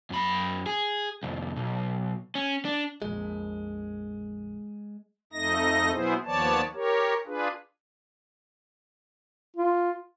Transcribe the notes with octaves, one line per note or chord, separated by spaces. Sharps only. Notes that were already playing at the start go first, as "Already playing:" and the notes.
F#2 B5
G#4
C2 F2
B1
C#4
D4
A#1 F2 G#3
F2 A3 D#4 D#5 A#6
B2 F#3 B3 E4 G#4 C5
D#2 F3 B3 C#5 D5 A5
G4 A#4 C#5
D4 F4 G#4 B4
F4